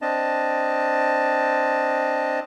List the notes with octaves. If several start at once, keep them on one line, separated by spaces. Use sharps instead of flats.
C4 D4 D#5 A5